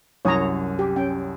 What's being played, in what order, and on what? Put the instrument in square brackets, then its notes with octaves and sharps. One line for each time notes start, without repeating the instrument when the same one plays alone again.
[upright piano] C2 F#2 D#6 [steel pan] C#5 A#5
[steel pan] G4
C#4 G5